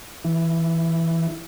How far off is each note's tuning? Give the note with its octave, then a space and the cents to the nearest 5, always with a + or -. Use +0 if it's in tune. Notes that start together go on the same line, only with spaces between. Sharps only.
E3 +0 E4 +0